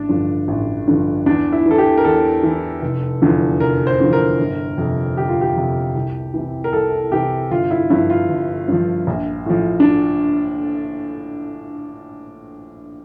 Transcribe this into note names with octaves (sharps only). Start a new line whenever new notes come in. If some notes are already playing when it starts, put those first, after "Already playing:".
Already playing: A1 D4
G2 D3 F3
A1
G2 D3 F3
E2 D4
E4
E3
A4
G4
A#4
E2 A4
E3
F1
E2 D3 F3
F1 A#4
C5
E2 D3 F3
A#4
G1
F2 C3
G1 G4
F4
G4
F2 C3
C2
C3 E3
A#4
C2 A4
C3 E3 G4
G1 F4
E4
G2 F3 E4
F4
G1
G2 F3
A#1
A2 F3
D4